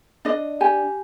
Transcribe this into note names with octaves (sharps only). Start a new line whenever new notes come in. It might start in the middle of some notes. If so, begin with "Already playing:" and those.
D4 D#5
G4 G#5